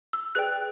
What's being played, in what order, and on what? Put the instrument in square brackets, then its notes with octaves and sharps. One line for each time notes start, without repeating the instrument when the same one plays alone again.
[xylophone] E6
G#4 B4 D5 G5 F#6